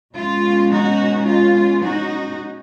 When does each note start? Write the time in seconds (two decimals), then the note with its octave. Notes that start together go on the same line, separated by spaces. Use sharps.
0.15 B2 G#3 C#4 F4
0.71 D#4 F#4
1.27 F4
1.82 D#4 F#4